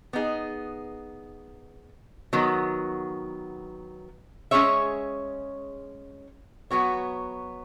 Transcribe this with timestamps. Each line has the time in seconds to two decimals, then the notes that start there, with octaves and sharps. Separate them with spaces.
0.13 B3 D#4 G#4
2.33 D#3 F#3 B3
4.51 G#3 C#4 G#4 C#5 E5
6.71 F#3 B3 F#4 C#5